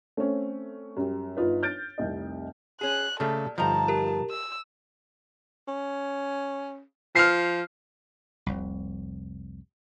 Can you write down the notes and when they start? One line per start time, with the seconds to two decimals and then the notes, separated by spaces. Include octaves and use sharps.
0.17 A3 C4 C#4
0.97 F#2 G3
1.37 G1 D#4 F4 B4
1.63 F6 G6 A6 D7
1.98 F1 C2 D#5
2.81 C#4 G#4 F#6
3.20 A#2 C#3 G3 A3 A4
3.58 G1 F3 D#4 D#5 A5 A#5
3.88 G4 A#4
4.30 E6
5.68 C#4
7.15 F3 F6 C7
8.46 F1 C2